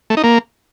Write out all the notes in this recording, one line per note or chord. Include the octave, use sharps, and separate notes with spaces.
A3
D#4
A#3